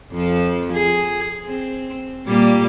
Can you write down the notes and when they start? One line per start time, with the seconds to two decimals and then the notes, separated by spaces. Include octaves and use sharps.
0.13 F2 F3
0.73 G#4
1.46 C4
2.26 A#2 G3 A#3